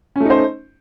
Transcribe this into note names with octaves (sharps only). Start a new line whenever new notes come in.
A3 C#4 D#4 C5